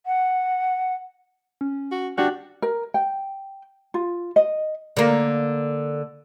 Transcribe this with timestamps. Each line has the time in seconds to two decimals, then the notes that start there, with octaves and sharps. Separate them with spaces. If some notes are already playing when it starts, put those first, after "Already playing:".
0.06 F#5
1.61 C#4
1.91 F#4
2.18 D4 F#4 G4 D5 F#5
2.62 A#4
2.94 G5
3.94 F4
4.36 D#5
4.97 D3 A#3